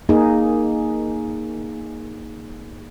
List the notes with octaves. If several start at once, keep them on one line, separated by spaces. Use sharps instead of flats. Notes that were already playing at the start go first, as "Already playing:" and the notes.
A#3 D#4 G#4